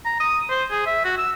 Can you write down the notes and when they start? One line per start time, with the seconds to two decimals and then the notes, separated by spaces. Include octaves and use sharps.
0.05 A#5
0.20 D#6
0.50 C5
0.71 G#4
0.86 E5
1.05 F#4
1.18 E6